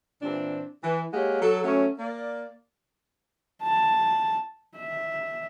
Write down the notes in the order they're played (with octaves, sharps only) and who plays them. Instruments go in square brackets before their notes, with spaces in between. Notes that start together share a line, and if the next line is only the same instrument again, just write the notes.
[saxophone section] A#2 E3 C4 D4
E3
G#3 A#3 G4 C#5 F#5
F#3 A4
F#3 A3 C#4
A#3 D5
[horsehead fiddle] A5
E5